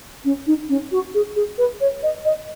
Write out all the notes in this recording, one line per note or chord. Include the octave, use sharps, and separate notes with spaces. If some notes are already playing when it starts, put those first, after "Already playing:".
C#4
D#4
C#4
F#4
G#4
G#4
B4
C#5
D#5
D#5